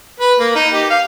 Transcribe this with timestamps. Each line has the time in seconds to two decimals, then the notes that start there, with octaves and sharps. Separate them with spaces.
0.20 B4
0.40 A#3
0.55 D#4
0.73 G4
0.90 F5